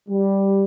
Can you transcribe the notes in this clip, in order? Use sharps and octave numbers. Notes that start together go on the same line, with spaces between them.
G3